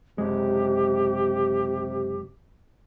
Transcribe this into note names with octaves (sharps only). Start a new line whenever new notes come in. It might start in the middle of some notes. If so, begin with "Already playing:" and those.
F#1 C3 G#3 G4